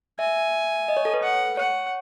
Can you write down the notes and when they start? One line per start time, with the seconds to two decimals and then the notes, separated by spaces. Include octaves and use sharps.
0.19 E5 G#5
0.88 D#5
0.97 C#5
1.05 A4
1.14 B4
1.23 F#5
1.57 C#5 F#5